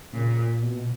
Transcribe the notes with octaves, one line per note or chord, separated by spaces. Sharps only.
A#2 C#3
A#2
B2